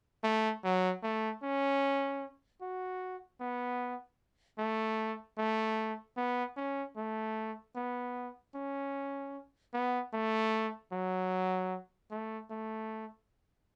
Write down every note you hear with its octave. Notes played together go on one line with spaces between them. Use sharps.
A3
F#3
A3
C#4
F#4
B3
A3
A3
B3
C#4
A3
B3
C#4
B3
A3
F#3
A3
A3